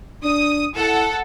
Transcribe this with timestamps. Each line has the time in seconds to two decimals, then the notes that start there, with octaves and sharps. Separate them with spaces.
0.23 D4 D#6
0.76 E4 A4 F#5